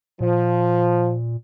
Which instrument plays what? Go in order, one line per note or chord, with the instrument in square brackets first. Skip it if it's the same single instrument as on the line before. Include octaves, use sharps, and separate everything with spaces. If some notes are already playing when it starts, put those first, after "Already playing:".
[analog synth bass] A#2 [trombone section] F3